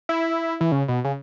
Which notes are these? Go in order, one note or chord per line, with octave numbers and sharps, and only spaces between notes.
E4
E3
C#3
B2
C#3